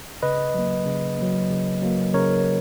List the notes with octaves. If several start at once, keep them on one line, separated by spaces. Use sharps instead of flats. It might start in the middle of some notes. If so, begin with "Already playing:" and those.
C#3 B4 D#5
F#3 A#3
C#3
F#3 A#3
C#3
F#3 A#3
C#3 A#4 C#5